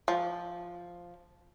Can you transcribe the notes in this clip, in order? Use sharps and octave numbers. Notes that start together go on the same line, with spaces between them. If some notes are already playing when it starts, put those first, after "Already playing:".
F3